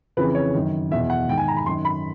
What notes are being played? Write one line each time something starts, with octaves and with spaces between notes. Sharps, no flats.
F2 C#3 E3 B4
C#5
F#2 D#3
E2 B2 E5
F#5
G#2 D#3 G5
G#5
A#5
B5
F#2 D#3 C6
B5